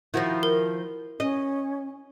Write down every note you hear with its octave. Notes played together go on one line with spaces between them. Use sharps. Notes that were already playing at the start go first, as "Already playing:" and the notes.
D#3 F3 E4 F#4 C5
A#4
C#4 D#5